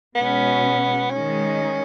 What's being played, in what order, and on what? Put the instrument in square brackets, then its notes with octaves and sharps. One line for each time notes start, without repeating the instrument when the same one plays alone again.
[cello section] B2 G#3 C#4 [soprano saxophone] B3
[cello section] D#3 G#3 D#4 [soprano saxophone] C#4